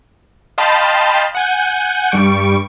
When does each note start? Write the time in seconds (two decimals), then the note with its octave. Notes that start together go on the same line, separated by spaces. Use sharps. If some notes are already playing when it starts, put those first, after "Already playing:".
0.58 D#5 F5 G5 A5 B5 C6
1.35 F#5 G#5 G6
2.11 G2 G3 C#6 D7